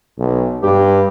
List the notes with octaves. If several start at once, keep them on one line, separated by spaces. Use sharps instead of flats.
B1
G2 G4